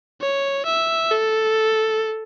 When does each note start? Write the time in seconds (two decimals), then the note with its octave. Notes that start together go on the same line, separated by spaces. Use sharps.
0.21 C#5
0.66 E5
1.11 A4